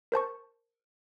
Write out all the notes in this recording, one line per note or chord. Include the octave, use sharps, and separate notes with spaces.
A#4 C5 A5 C#6